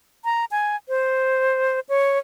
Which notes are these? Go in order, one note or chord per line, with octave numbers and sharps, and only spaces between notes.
A#5
G#5
C5
C#5